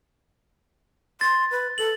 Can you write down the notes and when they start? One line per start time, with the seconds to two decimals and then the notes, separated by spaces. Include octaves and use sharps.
1.21 C6 A6
1.51 B4
1.78 A4 F#7